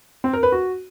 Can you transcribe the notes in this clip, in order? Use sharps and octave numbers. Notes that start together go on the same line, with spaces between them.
C4
A#4
B4
F#4